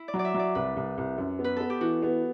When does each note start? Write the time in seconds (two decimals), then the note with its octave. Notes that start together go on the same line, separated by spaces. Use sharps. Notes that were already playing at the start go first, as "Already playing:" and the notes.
Already playing: E4
0.08 D5
0.14 F#3
0.19 D5
0.24 E5
0.34 F#3 D5
0.55 C2 B4
0.77 C2
0.98 C2
1.18 F#2
1.39 B3
1.44 B4
1.57 B3 A4
1.70 G4
1.81 E3 F#4
2.03 B3